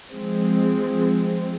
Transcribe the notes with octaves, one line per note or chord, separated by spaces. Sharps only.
F3 G#3 C4